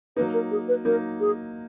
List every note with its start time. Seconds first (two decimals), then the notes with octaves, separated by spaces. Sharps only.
0.16 F#3 A#3 D#4 B4
0.34 A#4
0.51 G#4
0.68 B4
0.85 F#3 A#3 D#4 A#4
1.20 G#4